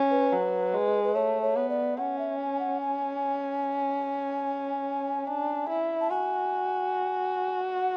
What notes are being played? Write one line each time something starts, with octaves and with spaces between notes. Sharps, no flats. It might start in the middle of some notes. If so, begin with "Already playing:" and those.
Already playing: C#4
B4
F#3
G#3
B4
A3 C#5
C#5
B3
D5
C#4 F#5
E5
G#5
F#5
G#5
D4
E4
A5
F#4 G#5
F#5